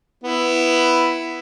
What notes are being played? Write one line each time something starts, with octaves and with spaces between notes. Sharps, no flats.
B3 E4